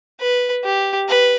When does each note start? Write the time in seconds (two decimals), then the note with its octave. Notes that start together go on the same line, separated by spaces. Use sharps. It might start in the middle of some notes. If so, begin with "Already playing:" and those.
0.20 B4
0.64 G4
1.08 B4